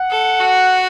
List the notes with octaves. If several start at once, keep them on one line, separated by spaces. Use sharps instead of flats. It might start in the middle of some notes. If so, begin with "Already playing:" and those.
Already playing: F#5
A4
F#4